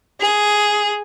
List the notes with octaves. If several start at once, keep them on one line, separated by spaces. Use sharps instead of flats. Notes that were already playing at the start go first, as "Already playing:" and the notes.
G#4